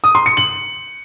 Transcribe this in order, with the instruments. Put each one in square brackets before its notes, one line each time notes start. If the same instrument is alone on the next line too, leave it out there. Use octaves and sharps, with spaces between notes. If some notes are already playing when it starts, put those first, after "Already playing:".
[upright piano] D#6
C6
C#7
F#7